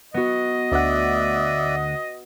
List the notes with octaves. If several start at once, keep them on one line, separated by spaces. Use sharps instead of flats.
B3 F#4 D#5
D2 D5 E5 F#5